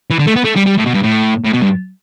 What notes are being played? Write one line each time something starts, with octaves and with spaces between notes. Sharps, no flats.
E3
D3
A3
B3
A3
G3
G3
A2
B2
G2
A2
A2
B2
G2